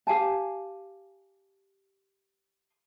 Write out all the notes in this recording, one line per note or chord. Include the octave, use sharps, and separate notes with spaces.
G4 F5 G#5 A5